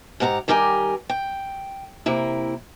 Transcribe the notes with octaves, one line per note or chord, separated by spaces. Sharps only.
G#2 G4 F#5 A5 A#5
D#3 G3 G4 A#4 G5 G#5
G5
C3 A#3 E4